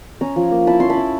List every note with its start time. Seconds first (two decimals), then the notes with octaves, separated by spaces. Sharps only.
0.21 C#4 G#5 A#5
0.36 F3
0.51 A#3
0.67 E4 A5 B5
0.80 C#4 C6
0.90 A5 B5
0.97 E4